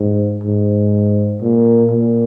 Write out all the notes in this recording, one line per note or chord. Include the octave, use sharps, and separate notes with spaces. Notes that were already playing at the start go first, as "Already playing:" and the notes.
Already playing: G#2
G#2
A#2
A#2